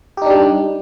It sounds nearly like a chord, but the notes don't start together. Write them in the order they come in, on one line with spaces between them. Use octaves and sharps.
G4 D#4 D4 G3